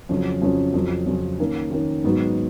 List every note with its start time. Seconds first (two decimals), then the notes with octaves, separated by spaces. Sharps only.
0.09 F2 C#3 F#3 C#4
0.42 F2 C#3 F#3 C#4
0.74 F2 C#3 F#3 C#4
1.06 F2 C#3 F#3 C#4
1.39 D#3 A#3 C#4
1.71 D#3 A#3 C#4
2.04 G#2 F#3 B3 D#4 F#4